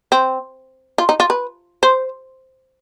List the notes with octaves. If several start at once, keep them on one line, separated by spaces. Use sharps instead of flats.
C4
F4
D#4
F4
B4
C5